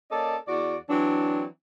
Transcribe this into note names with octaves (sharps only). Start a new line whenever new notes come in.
A#3 C#4 A4 D5 D#5
E2 F#4 D5
E3 F#3 C4 D4